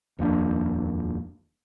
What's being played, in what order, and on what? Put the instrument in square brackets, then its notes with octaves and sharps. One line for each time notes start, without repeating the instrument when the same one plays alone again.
[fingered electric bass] D#1 F2 A#3 D4